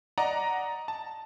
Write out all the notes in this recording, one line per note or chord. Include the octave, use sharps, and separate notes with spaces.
D5 D#5 F#5 A#5
A5